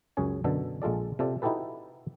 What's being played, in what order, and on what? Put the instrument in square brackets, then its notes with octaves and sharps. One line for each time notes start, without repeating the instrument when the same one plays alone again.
[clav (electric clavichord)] C#2 F#2 G#4 C#5 G#5
F#2 B2 D3 A4
A#1 G#3 F4 A4 D5
C3 F4 A4 D5
D#4 E4 F#4 G4 A4 B4